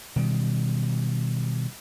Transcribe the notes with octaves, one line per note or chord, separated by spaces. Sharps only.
B2 D#3 G3